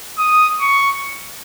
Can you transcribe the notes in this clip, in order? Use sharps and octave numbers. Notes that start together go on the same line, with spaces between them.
D#6
C#6